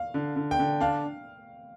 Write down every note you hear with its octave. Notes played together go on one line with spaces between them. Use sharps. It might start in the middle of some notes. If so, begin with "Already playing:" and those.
Already playing: F5
D3
D3
G5
D3
D4 F5